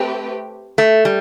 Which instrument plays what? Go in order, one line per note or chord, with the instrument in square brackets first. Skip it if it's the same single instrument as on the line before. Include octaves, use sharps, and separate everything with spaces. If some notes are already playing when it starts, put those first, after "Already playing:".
Already playing: [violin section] A3 C4 G4 B4
[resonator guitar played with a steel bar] A3
G3